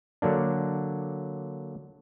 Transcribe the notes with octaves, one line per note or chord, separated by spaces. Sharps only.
D3 F#3 A#3 D4